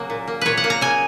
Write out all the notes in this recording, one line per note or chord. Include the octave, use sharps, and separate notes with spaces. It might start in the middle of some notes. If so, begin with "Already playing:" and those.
Already playing: C#3 F#3 A#3
A#2
A#3
A#2 B4 C#5
F#5
A#3
A#5
C#3 G#5